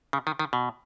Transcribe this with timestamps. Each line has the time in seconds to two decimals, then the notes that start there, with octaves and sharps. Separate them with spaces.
0.13 C#3
0.27 D#3
0.39 D#3
0.53 B2